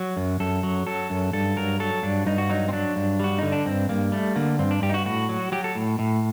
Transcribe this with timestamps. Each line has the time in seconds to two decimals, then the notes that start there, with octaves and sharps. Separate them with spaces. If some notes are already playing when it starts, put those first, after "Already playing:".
Already playing: F#3
0.17 F#2
0.40 F#2 A4
0.63 F#3
0.87 F#3 A4
1.10 F#2
1.33 G2 A4
1.56 F#3 A#4
1.80 F#3 A4
2.03 G2 D4
2.26 G2 D#4
2.38 F#4
2.50 F#3 D#4
2.68 C4
2.73 F#3 D4
2.96 G2
3.20 G3 F#4
3.38 D3 D#4
3.52 D4
3.66 G2 C4
3.89 G2 A#3
4.12 G3 A3
4.36 D3 A#3
4.59 G2 C4
4.71 D4
4.82 G2 G4
4.89 D#4
4.94 F#4
5.06 A2 F#4
5.29 F#3
5.52 F#3 G4
5.64 A4
5.75 A2
5.99 A2